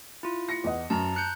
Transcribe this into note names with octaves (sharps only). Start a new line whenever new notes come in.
E4 F4
A#6 C#7
E2 D#5 F#5
F#2 A5 A#5
F#6 G6 C#7